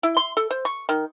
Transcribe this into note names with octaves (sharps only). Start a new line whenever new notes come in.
E4
C6
A4
C5
C#6
D#3